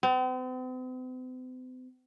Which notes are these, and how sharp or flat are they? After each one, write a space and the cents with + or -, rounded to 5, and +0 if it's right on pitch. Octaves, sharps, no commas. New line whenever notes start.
C4 -45